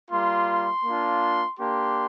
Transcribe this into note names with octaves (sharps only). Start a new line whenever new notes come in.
G3 A#3 F4 C6
A#3 D4 F4
A#3 D4 G4 C6